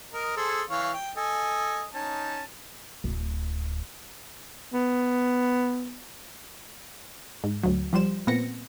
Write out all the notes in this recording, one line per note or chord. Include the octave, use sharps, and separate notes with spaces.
A#4 D#5
G#4 A4 C5
E3 C#5 F5
G5
A4 D#5 G#5
C#4 D#4 A5
D1
B3
G#2
D2 F#3
F3 G3 C5 E7
A#2 B3 C4 A#6 C#7